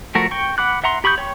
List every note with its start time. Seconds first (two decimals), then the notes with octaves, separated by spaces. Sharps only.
0.15 F3 A3 F#4 A#4
0.31 G5 C#6
0.58 F#5 B5 D6 F#6
0.84 E5 F#5 A#5 C6
1.04 G4 B5 C#6 D#6 G6
1.18 C#5 G5 C#6